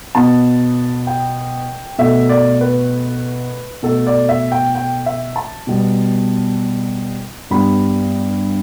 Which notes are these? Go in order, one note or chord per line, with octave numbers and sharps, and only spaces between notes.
B2 B3 A5
G5
B2 A3 E5
D5
B4
B2 A3 A4
D5
E5
G5
G5
E5
A5
B2 G3 B3
G2 G3 B3 B5